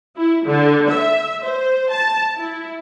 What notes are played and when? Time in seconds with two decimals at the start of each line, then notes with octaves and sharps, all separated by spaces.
0.17 E4
0.46 D3
0.90 E5
1.43 C5
1.91 A5
2.37 E4